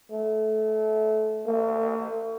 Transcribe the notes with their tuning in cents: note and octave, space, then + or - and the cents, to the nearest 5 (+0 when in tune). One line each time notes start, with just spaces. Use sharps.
A3 -20
A3 +45